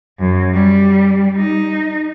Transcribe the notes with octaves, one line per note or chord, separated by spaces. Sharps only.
F#2
G3
D#4